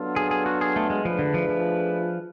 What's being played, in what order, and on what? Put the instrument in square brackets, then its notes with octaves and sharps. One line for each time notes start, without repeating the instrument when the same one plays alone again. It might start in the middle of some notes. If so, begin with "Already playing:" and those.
Already playing: [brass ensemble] F#3 B3 D4 F4 A4
[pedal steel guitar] G#4
G#4
F#4
G#4
A3
G#3
[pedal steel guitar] F3 [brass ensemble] A3 D4 G#4 B4
[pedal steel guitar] D3
F3
F3